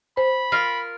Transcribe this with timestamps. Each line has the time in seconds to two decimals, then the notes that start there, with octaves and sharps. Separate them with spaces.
0.17 C5 B5
0.52 F4 A#4